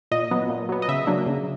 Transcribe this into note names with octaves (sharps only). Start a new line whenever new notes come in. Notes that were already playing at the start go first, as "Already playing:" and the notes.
A#2 D#5
F#3 B3
A#2
F#3 B3
D#5
C#3 E5
F#3 A#3 D4
C#3